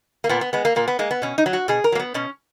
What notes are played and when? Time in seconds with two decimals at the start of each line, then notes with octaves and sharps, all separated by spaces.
0.24 A#3
0.29 A#2 B3
0.41 B3
0.53 G#3 B3
0.65 A#3
0.76 A#2 A#3
0.88 B3
0.99 G#3 A#3
1.11 B3
1.22 B2 C#4
1.38 D#4
1.46 F#3
1.53 F#4
1.68 B2 G#4
1.84 A#4
1.92 F#3 A#3
1.99 B3
2.14 B2 C#4